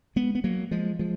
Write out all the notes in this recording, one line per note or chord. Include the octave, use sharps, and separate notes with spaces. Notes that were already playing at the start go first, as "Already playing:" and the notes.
G#3 B3
B3
F#3 A#3
F3 G#3
F3 G#3